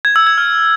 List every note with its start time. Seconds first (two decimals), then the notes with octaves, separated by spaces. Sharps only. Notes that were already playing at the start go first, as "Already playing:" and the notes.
0.05 G#6
0.16 E6
0.27 G#6
0.38 F6